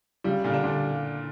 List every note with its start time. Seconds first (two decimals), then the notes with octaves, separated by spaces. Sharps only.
0.24 C#3 G3
0.44 A#2 D3
0.53 D4
0.64 A#2 D3